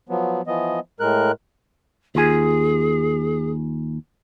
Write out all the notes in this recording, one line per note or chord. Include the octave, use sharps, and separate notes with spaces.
F3 F#3 B3
E3 F3 B3 D#5
A2 G#3 A#4 F#6
D#2 F4 G#4 G#5